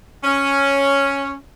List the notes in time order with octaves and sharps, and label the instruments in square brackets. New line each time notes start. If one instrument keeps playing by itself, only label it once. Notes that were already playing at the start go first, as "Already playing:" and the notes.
[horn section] C#4